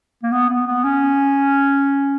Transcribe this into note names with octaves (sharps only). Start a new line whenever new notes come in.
A#3
B3
B3
B3
C#4